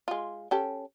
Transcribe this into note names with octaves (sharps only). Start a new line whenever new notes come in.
G#3 F4
C#4 G4 A4